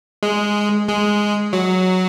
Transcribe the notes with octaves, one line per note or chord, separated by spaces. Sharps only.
G#3
G#3
F#3